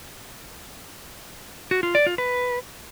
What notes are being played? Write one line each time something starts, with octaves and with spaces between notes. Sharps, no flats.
F#4
F4
D5
F4
B4